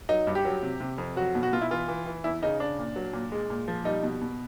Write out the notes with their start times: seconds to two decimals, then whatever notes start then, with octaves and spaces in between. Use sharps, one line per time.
0.09 F#3 D#4
0.27 G2
0.35 G4
0.45 F#3
0.63 C3
0.80 C3
0.98 F2
1.16 F#3 F#4
1.35 B2
1.43 F#4
1.53 B2 F4
1.61 E4
1.71 E3 F4
1.88 E3
2.06 E3
2.24 E2 E4
2.42 C#3 D#4
2.60 C#3 D4
2.79 A#2
2.96 F#3
3.13 A#2
3.32 G#3
3.50 A#2
3.68 F3
3.85 G3 D#4
4.03 B2
4.21 B2